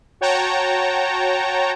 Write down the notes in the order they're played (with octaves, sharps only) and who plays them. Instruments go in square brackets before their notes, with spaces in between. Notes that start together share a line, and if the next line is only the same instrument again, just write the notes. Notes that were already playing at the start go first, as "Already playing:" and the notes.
[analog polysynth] F#4 C#5 G5 A5 A#5